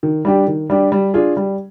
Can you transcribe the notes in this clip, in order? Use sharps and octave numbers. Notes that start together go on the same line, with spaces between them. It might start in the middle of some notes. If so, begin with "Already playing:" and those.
D#3
G3 D4 G4
D#3
G3 D4 G4
G3
D4 F4 G#4
G3